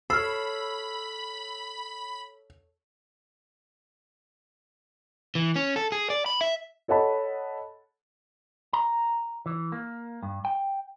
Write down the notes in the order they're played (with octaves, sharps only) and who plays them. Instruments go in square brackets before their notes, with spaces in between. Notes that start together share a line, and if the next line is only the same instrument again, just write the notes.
[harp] A4 C#5 [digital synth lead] B5 [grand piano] E6 [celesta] F6 C7
[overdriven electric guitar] E3
C#4
A4
G#4
D5
B5
E5
[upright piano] A4 C#5 D#5 F#5 A5 B5
[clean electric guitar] A#5
E3
A#3
G2
G5